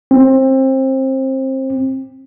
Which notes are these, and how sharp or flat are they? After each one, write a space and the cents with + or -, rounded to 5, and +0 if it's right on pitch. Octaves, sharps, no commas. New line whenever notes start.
C4 +25